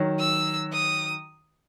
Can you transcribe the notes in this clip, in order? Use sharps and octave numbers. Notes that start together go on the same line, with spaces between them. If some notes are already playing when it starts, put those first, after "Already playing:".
Already playing: D#3 F#3
E6
D#6